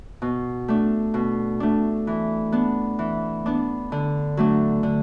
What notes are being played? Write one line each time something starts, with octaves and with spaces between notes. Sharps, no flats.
B2
A3 D4
B2
A3 D4
E3
B3 D4
E3
B3 D4
D3
F#3 A3 D4
D3